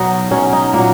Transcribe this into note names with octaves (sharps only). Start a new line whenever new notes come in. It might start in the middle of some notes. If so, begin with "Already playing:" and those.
Already playing: B2 F#3 D#4
B2 F#3 C#4
D#4
A#2 F#3 A#3